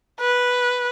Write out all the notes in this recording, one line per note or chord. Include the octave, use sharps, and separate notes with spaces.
B4